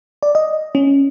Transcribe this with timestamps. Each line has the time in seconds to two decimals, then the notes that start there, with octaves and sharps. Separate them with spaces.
0.23 D5
0.35 D#5
0.75 C#4